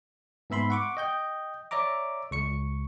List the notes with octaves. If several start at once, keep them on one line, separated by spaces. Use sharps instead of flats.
G#2 B3 E5 B5 C6
F#5 C#6 D6
D#5 G5 G6
C#5 D5 E5 A#5 D6
C#2 C#6 C#7